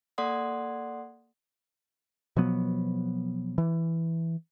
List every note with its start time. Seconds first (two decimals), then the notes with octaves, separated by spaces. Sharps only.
0.18 A#3 A4 D5 F#5 C6 D#6
2.36 B2 F3 F#3 B3
3.58 E3